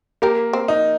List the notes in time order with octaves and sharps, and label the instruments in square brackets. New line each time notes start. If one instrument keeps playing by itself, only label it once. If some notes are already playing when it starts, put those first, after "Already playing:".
[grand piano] A#3 [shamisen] G4 A#4
[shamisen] C4
[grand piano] D#4